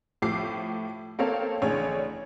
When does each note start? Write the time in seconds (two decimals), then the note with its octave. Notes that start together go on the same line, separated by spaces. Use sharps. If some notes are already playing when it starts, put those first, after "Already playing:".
0.22 A2 F3 G4 D6 C7
1.19 A#3 C4 A4 A#4 C#5 F5
1.62 A1 C#3 D4 C#5 G#5